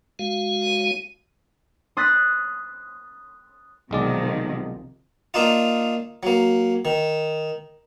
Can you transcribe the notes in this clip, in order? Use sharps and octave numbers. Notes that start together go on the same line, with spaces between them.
G#3 F#4 F5
D#7
C6 D#6 F#6 A6 B6
B1 C3 D#3 F3 G#3 D5
A#3 D4 D#4 F4
F#3 A#3
D#3